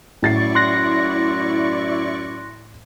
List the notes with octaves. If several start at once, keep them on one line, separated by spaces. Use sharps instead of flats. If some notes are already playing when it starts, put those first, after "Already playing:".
F#2 A2 E4 D5 C#6 A6 C7
C6 F#6 A#6